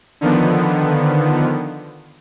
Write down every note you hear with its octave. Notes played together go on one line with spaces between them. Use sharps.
D3 D#3 F3 B3